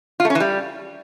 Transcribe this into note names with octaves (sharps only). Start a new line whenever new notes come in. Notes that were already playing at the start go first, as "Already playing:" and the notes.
F4
A3
C#4
E3
G3